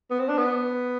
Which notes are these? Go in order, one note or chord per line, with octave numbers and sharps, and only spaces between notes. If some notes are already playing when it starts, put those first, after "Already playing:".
B3
C4
D4
B3